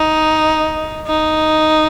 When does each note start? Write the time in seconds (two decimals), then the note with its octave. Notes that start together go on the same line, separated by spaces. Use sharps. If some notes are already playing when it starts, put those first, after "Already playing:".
Already playing: D#4
1.07 D#4